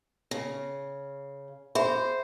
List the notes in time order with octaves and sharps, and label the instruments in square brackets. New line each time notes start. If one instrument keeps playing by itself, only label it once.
[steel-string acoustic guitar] C#3
[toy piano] G#4 E5 B5 [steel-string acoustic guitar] C5